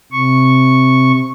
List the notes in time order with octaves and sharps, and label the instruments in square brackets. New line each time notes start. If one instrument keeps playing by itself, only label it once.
[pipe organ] C3 C#6